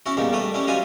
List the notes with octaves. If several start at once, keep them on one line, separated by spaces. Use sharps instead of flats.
C#4 E4 F#4
E2 A#2 G3 D#4
G3 A3 B4
G3 C#4 E4
F#3 G3 D#4 F4 B4 G#5